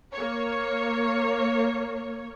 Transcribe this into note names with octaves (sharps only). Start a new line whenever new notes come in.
A#3 C#5